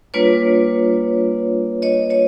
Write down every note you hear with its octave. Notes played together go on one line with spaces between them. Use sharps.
G3 A#3 D4 F4 B4 C#5
C#5 D#5
C#5 D#5